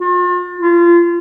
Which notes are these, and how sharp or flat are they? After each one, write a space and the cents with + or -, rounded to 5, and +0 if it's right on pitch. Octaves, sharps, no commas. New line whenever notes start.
F4 +40
F4 -25